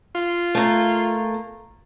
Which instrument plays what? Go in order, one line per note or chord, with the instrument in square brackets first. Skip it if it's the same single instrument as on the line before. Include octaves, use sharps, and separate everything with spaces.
[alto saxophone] F4
[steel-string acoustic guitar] A3 A#3